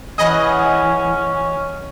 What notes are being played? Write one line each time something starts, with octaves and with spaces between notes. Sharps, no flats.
E3 C#4 G#4 B4 D#5 F#5